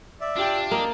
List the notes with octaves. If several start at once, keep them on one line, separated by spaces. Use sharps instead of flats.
D5 E5
D4 F4 G4 G5
A#3 D#5